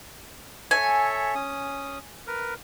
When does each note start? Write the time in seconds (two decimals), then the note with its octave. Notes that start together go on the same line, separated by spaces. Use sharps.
0.71 A4 C#5 E5 G#5
1.35 C#4 D#6
2.27 A#4 B4